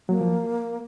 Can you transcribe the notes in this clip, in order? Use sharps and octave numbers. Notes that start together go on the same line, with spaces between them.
F#3 A#3
F3